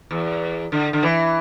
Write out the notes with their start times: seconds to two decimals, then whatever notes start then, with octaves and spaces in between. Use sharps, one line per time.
0.11 E2
0.72 D3
0.93 D3
1.03 E3